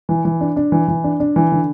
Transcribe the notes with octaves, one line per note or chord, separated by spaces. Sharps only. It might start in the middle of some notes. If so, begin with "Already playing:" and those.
E3
E3
D4
D4
E3
E3
D4
D4
E3
D3